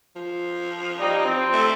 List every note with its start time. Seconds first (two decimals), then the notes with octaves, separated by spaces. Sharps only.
0.16 F3
0.99 G3 A#3 D#4
1.24 C4
1.53 A3